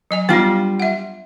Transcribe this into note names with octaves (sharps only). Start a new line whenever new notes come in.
F#3 D#5 G#5
G3 B3 D4 F4
E5 F#5